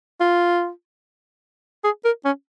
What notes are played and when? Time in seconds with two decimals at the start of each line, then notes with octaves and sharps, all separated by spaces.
0.20 F4
1.84 G#4
2.05 A#4
2.25 C#4